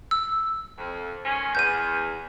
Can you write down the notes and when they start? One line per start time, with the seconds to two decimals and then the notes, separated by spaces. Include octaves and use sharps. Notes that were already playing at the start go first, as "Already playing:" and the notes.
0.11 E6
0.78 F2
1.24 D#3 G#3 C#4
1.55 E2 G6 D#7